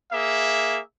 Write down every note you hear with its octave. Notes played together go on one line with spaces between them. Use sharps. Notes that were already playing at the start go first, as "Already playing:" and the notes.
A#3 G#4 E5